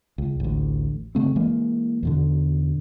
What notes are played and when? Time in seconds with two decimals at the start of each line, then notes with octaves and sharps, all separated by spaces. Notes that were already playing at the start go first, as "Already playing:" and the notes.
0.18 C#2
0.40 A1 D2
1.15 C#3 A3 C4
1.36 E3 G#3 A#3
2.03 E2 B2 D3